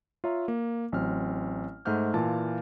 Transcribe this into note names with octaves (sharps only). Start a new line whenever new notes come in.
F4 C#5 E5 A#5
A#3
A1 F#3 C4 F6
G#2 A3 C5 F#5 F6 G6
A#2 E3 F4 F5 A5